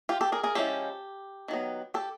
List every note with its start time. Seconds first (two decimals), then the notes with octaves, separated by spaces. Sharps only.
0.09 F4 G4
0.21 G4 A4
0.32 G#4 A#4
0.43 G#4 A#4
0.55 F3 G#3 C#4 E4 G4 A4
1.48 D#3 F#3 B3
1.94 G4 A4